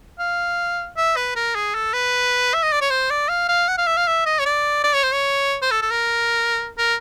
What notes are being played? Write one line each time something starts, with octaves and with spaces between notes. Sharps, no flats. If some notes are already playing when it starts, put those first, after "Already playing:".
F5
E5
B4
A#4
G#4
A4
B4
E5
D#5
D5
C#5
C5
D5
F5
F5
F#5
F5
E5
F5
E5
D#5
C#5
D5
D5
C#5
C5
C#5
C5
A4
A4
A#4
A#4